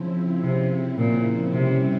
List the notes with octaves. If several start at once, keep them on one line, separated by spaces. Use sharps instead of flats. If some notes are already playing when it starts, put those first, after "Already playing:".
Already playing: C#3 F3 C4 E4
C3
A#2
C3 G3 C#4 E4